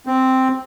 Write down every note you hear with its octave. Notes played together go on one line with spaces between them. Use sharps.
C4